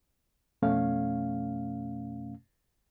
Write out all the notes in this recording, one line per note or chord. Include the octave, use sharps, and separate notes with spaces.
F2 B2 A3 C#4 F5